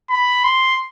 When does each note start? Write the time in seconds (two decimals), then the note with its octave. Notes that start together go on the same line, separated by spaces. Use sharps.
0.10 B5
0.44 C6